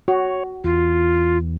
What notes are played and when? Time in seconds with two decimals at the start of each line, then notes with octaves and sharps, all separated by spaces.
0.08 F#4 C#5
0.64 E2 F4